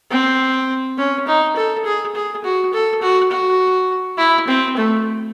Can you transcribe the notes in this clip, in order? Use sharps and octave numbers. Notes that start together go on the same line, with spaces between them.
C4
C#4
D#4
A4
G#4
G#4
F#4
A4
F#4
F#4
E4
C4
A3